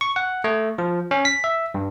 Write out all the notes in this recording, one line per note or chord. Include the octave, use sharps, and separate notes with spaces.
C#6
F#5
A3
F3
C#4
B6
E5
G2